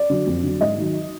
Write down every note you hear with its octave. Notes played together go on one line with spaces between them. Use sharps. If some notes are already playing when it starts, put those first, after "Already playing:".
Already playing: D5
D3 F#3
F2
D3 F#3
G#2 D#5
D#3 F#3